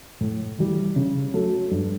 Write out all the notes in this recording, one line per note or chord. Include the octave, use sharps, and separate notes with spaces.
A2
E3 G3
C#3
F#3 A3
G2